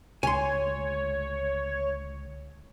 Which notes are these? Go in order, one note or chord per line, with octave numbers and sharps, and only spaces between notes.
C#2 D3 G#3 C#5 G#5 C6